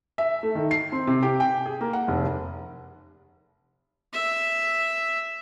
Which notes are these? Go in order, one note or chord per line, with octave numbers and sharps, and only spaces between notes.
E5
A3
D#3
C7
C4
C3
G4
G5
G#4
A#3
F#5
F1
E5